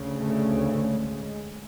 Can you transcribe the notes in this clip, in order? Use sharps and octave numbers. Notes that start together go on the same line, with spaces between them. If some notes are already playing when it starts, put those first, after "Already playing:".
Already playing: D2 C#3
A3
A3
G#3
G#3